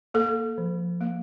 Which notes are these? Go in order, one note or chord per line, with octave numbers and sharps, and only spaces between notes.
A#3 A4
F3
A#3